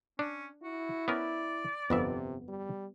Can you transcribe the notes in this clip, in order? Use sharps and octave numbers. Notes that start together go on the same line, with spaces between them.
C#4 D4
E4 F#4
B3 C#4 A#4 D5
G1 F2 C3 B3 E5
G3